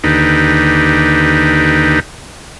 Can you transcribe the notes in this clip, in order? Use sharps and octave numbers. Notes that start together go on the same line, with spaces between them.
D#2 D3 D#4 G4 B4